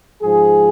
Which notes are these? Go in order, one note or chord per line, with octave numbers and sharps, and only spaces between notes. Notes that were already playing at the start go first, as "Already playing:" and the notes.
G#2 F3 G#4